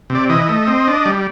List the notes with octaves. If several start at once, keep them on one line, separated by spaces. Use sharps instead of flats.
C3
D5
E3 D#5
A3
C4
D4
G3